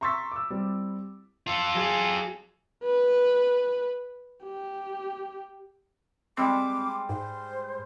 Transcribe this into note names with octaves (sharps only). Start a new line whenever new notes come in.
A#5 C6 C#6 E6 A6 B6
D6 E6
G3 C4 E4
F4 A4
F#3 G#4
B4
G4
G3 G#3 C4 D6
G#2 C5